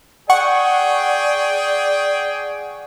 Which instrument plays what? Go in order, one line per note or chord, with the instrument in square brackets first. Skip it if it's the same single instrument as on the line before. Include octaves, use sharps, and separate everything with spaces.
[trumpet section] G#4 G5 [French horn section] D5 [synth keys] F#5 C#6